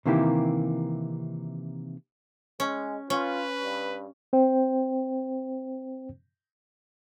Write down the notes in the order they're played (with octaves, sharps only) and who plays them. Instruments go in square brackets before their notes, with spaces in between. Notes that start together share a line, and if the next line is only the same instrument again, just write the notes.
[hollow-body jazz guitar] C3 D#3 E3 A#3 E4 G4
[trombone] G#3 [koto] C#4
[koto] C#4 [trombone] F4 [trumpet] B4
[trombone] G2
[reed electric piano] C4 C5 G5